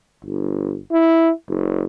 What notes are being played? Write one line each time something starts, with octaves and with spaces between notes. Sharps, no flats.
G1
E4
F#1